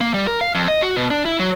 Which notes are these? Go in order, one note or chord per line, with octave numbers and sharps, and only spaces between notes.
A#3
G3
A#4
F5
F2
D#5
F#4
B2
D4
E4
F#3